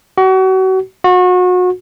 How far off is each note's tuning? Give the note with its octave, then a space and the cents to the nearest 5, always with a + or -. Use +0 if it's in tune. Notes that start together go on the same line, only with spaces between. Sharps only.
F#4 +35
F#4 -30